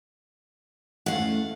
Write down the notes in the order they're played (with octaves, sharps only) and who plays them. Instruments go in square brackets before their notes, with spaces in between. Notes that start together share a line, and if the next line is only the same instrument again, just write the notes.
[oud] E2 A3 C#4 [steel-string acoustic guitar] F5 F#5